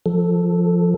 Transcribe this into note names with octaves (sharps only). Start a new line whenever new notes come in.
F3 A4